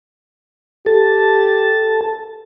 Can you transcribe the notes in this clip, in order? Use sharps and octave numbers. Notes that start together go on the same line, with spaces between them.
G4 A4 A5